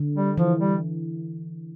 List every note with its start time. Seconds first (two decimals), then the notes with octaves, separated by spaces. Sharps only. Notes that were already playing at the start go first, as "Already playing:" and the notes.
Already playing: D3
0.16 G3
0.37 E3 F3
0.59 G3